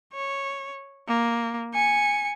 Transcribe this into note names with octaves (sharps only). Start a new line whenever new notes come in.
C#5
A#3
G#5 C#7